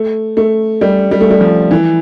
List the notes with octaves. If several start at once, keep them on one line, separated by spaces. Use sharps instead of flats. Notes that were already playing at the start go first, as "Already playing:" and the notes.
Already playing: A3
A3
G3
G3
A3
G3
F3
E3